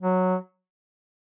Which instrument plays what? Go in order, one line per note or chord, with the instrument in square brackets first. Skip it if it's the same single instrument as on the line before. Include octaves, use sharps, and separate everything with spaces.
[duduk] F#3